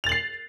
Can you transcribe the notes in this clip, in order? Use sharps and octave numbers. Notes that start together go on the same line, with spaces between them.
A6 C7 F7 F#7